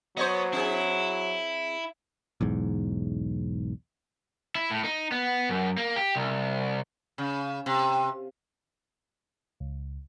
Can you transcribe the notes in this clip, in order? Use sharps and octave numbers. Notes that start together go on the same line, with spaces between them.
F#3 B3 C5 C#5 D#5
C4 E4 G#4
B1 E2 G#2
E4
A2
D#4
B3
F#2
A#3
G4
C2
C#3
C3
C#2